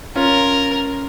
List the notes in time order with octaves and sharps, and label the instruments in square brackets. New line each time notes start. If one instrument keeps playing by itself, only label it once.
[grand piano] C#4 F4 [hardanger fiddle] A#4